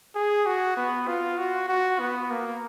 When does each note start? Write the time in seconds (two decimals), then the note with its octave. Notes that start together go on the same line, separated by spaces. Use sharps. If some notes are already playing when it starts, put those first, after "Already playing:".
0.15 G#4
0.46 F#4
0.77 B3
1.08 F4
1.38 F#4
1.69 F#4
2.00 B3
2.31 A#3